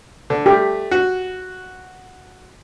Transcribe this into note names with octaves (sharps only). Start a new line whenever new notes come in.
D3
A3 G4
F#4